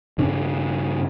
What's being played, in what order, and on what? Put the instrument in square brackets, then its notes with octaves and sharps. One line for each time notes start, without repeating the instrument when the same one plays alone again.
[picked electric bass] G2 C#3 C#4 D4